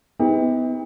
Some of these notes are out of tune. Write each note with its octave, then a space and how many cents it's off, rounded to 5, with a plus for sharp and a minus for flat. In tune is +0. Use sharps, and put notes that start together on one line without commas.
B3 +30 D#4 +45 G4 +30